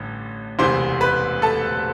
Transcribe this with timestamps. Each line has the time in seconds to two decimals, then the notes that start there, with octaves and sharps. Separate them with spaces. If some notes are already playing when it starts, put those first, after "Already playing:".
Already playing: A1 G2 D3
0.59 E1 D2 C3 E3 C5 C6
1.01 B4 B5
1.42 A4 A5